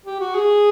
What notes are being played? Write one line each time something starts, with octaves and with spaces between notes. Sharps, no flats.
G4
F#4
G#4